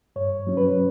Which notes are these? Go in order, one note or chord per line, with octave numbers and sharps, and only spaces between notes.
G2 C#5
F#3 C#4
B4